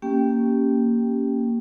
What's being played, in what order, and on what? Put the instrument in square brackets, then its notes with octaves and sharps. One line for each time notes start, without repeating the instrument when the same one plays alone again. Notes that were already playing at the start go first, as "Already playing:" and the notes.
[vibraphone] A#3 C#4 G4 G5